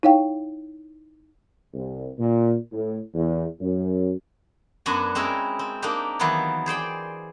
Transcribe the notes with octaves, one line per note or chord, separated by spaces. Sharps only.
D#4 E4 C#5 F5 G5
C2
A#2
A2
E2
F#2
F#2 B3 D4 F#4 F#5 G#5
G#3 C4 C#4 E4 A#4
C4
A#3 D4 D#4 G4
D#3 E3 F#3 B3 E4 F4
G#4 C5 D5 G5